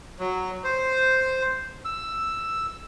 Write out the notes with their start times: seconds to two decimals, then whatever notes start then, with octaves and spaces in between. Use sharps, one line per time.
0.19 F#3
0.64 C5
1.85 E6